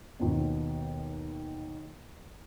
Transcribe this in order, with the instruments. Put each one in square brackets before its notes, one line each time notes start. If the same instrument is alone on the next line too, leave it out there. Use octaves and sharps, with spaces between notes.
[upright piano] D#2 B2